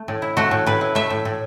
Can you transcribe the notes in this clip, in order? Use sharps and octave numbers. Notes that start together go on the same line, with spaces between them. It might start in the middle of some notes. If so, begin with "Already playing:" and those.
Already playing: A3
A2
E4
A3 F#4
A2
A2 B4
E4
A3 E5
A2
A2